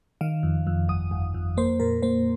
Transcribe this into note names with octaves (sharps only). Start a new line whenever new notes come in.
D#3 F5
F2
F2
G1 D#6
G1
F2
A#3 C5
A#2 A#4
A#3 C5